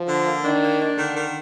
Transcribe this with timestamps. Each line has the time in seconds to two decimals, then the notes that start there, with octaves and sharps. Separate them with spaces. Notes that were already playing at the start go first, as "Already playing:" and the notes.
Already playing: F3
0.08 D3
0.27 A#3
0.44 D#3 D4
0.63 A#3
0.80 D4
0.97 D3 D#3
1.16 D#3